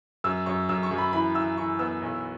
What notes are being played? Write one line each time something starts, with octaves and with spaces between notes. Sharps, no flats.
F#2 E6
F#2 C#6
F#2 E6
C#6
F#2
B5
E3 B5
E3 E6
E3 C#6
B3 E6
B1